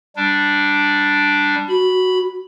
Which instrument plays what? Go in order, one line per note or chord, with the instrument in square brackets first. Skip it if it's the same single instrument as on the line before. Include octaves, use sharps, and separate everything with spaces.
[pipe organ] G3 D4
[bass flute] F#4 [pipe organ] B5